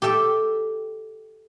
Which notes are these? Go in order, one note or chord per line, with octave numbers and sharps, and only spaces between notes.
G4 A4 E5 G5